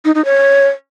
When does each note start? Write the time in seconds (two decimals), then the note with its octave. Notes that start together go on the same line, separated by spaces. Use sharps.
0.05 D#4
0.15 D#4
0.25 C#5